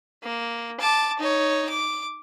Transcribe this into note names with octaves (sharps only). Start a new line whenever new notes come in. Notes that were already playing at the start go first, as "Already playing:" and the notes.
A#3
A5 D6
D#4 C#5
D6